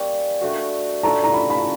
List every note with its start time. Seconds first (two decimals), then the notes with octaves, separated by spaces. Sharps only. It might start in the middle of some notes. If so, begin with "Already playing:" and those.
Already playing: G3 A#3 C#4
0.41 A3 D4 F#4
1.03 D4 F4 A4 C#5 A#5
1.24 A#5
1.34 B5
1.50 B5